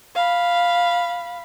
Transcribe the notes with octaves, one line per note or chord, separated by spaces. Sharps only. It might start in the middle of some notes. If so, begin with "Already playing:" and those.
F5 B5